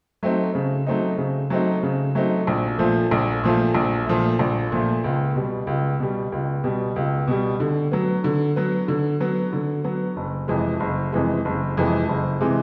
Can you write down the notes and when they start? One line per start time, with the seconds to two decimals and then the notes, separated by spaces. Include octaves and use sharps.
0.23 F#3 A3 C4 D#4
0.55 C#3
0.87 F#3 A3 C4 D#4
1.18 C#3
1.50 F#3 A3 C4 D#4
1.83 C#3
2.15 F#3 A3 C4 D#4
2.47 A#1
2.78 A#2 F3 A3
3.11 A#1
3.44 A#2 F3 A3
3.74 A#1
4.07 A#2 F3 A3
4.39 A#1
4.72 A#2 F3 A3
5.04 C#2
5.35 B2 G3
5.67 C#2
6.00 B2 G3
6.32 C#2
6.64 B2 G3
6.96 C#2
7.27 B2 G3
7.60 D3
7.92 F#3 B3
8.24 D3
8.56 F#3 B3
8.88 D3
9.20 F#3 B3
9.53 D3
9.84 F#3 B3
10.16 F#1
10.48 F2 C3 E3 G#3
10.80 F#1
11.12 F2 C3 E3 G#3
11.45 F#1
11.77 F2 C3 E3 G#3
12.09 F#1
12.41 C3 E3 G#3